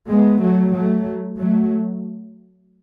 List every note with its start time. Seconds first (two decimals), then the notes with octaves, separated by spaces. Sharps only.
0.09 G#3 B3
0.41 F#3 A3
0.74 F#3 A3
1.38 F#3 A3